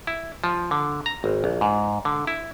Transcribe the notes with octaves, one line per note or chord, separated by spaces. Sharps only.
E4
F3
D3
A#5
G#1
A#1
G#2
D3
E4